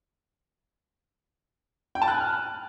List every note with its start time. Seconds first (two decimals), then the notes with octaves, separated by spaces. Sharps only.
1.95 G5
2.02 A5
2.08 F#6
2.14 G#5
2.21 F6